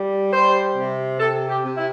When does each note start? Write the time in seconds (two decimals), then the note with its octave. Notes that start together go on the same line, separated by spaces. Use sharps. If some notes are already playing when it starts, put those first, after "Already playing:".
Already playing: G3
0.33 G3 C5
0.76 C3
1.19 C3 A4
1.48 G4
1.63 C3
1.77 E4